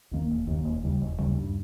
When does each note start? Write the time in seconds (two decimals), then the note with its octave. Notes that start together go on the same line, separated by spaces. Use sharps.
0.11 D#2 D#3 A#3
0.30 E1
0.47 D#2 D#3 A#3
0.64 E1
0.83 D#2 C#3 G3
1.01 E1
1.18 D#2 C#3 G3
1.36 G2